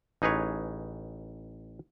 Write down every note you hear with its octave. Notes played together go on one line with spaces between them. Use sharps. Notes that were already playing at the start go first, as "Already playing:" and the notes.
A1 D#4 G#4 B4 C#5